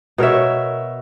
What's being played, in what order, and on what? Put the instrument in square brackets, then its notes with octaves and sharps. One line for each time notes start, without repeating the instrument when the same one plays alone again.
[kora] B2 A#4 C#5 E5